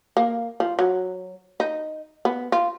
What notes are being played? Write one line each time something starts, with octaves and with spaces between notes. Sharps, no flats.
A#3
F3
F#3
D#4
B3
F4